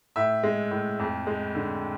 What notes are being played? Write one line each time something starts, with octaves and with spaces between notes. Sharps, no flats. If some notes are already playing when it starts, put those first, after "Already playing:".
A2 E5
G#3
A2
F2
G#3
D3